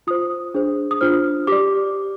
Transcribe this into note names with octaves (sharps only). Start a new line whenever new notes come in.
F4 C5 D#6
D4 G#4 C5
D#6
D4 F4 C5 F6
G4 D5 D6